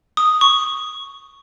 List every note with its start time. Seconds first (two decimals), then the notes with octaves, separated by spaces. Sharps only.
0.17 D#6
0.41 C#6